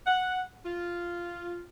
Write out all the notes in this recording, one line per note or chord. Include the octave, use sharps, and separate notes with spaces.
F#5
F4